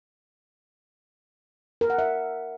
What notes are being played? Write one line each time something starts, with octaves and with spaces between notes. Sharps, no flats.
A#4
F#5
E5